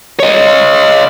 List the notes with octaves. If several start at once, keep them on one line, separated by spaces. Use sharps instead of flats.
C#5 D#5